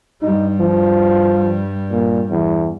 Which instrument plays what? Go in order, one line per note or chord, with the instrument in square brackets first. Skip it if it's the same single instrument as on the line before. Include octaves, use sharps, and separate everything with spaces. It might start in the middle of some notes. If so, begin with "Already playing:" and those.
[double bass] G2 G3 [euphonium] D#4
[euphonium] F3
A#2
E2